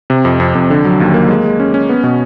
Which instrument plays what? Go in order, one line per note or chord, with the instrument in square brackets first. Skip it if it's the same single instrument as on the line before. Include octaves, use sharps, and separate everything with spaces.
[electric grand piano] C3
F2
F2
F2
D3
F#3
D#2
A#3
G#3
G#3
C#4
C#4
B3
B2